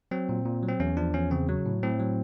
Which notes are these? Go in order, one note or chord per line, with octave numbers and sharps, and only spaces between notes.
F#3 C4
A#2
A#2
F#3
C4
E2 C#4
F3 D4
E2 C#4
C#3 C4
F#3
A2
A2 C4
F#3